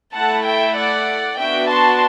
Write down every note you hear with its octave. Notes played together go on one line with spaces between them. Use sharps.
A3 E4 A4 F#5 A5
E5 G5
D5 F#5
B3 D4 F#4 E5 G5
A5 C6